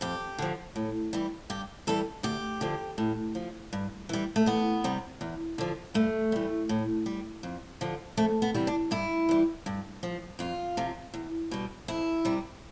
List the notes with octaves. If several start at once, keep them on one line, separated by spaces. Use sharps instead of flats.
F2 G4
D3 F3
A2
E3 G3
G2 G4
E3 G3 A4
D2 G4
D3 F3
A2
F3
G2
E3 G3
A3
E2 B3
C3 G3
E2
D3 F3
G2 A3
E3 G3
A2
G3
F2
D3 F3
F2 A3
B3
C3 E3 G3
D4
G2 E4
E3 G3
G2
F3
F2 F4
C3 F3
E2
B2 G3
F2 E4
C3 G3